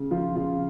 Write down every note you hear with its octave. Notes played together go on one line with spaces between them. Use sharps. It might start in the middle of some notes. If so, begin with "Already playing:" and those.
Already playing: C#3
F3 F4
C#3 F4